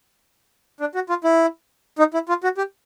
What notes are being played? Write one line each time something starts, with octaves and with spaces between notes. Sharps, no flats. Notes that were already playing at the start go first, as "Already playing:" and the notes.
D4
F#4
F4
E4
D#4
E4
F4
F#4
G4